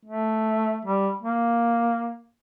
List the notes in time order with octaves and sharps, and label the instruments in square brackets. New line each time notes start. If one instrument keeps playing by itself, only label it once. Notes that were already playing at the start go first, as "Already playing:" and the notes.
[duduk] A3
G3
A#3